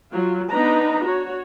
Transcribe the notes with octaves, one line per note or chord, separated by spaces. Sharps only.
F#3 F4
B3 D4 D#4 B4 A#5
F#4 C#5